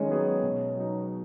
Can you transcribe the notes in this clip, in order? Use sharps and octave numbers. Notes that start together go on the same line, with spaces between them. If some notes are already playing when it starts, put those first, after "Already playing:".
Already playing: D#3 G#3 C#4
F#3 B3 G#4
B2
F#3 D#4